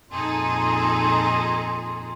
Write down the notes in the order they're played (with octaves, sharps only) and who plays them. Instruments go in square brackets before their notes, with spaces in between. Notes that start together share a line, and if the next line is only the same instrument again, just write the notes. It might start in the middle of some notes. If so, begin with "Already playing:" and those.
[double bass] F2 A#2 [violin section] D#4 G#4 A4 [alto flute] C6